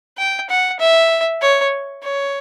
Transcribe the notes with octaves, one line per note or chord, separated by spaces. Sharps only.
G5
F#5
E5
C#5
C#5